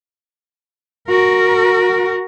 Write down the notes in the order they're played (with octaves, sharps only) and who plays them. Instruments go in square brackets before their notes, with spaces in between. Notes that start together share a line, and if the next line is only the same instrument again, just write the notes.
[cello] F#4 A#4